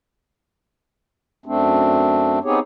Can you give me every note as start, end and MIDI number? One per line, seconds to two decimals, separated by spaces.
1.46 2.39 42
1.46 2.39 57
1.46 2.39 60
1.46 2.39 62
2.44 2.59 59
2.44 2.59 60
2.44 2.59 63
2.44 2.59 67
2.44 2.59 68
2.44 2.59 73